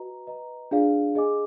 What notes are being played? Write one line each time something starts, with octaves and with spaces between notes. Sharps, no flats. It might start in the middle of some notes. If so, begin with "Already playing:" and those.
Already playing: F#4 B4 D#5 A#5
B4 D#5 A#5
D4 F4 G#4 D5 F5
G#4 D#5 G#5 D6